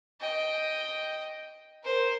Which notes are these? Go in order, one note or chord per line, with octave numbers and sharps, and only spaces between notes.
D#5 G5
A#4 C5